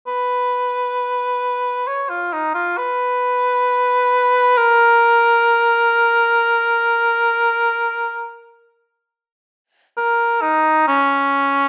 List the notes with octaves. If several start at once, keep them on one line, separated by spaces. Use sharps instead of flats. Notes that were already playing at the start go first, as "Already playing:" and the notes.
B4
C#5
F4
D#4
F4
B4
A#4
A#4
D#4
C#4